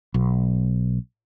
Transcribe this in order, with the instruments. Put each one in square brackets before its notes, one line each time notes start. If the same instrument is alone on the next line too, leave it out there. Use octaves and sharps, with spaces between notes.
[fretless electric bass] B1